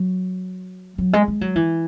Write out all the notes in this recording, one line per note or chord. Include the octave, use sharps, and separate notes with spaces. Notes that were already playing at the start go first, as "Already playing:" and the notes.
Already playing: F#3
F#3
G#3
G#3
F#3
E3